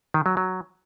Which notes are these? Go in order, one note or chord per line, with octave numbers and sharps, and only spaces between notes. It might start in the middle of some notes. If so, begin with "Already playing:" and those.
D#3
F#3
F#3